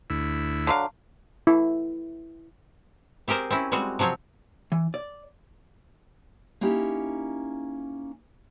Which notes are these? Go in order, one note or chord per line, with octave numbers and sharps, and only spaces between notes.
D2 E4
D3 F#3 F5
E4
C4 G4 G#4 A#4 C5
C4 C#4 E4
G3 G#3 C4 F#4
C3 F3 F#3 C4 C#5
E3
D5
A#3 C#4 D#4 E4 G4